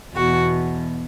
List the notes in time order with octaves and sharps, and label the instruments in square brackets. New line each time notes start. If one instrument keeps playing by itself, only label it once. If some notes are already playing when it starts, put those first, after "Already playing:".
[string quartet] E2 B2 F#4